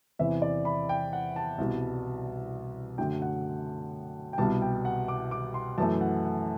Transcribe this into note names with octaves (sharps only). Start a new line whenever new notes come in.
E2 C3 E3 E5
D5
B5
G5
F#5
A5
C2 B2 G3
F#2 D3 F#3 A3 G5
F#5
G5
C2 B2 G3 A5
G5
F#5
D6
D6
C6
F#2 E3 A3 A5
F#5
F#5